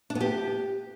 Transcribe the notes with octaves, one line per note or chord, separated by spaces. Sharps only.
D4
B3
G4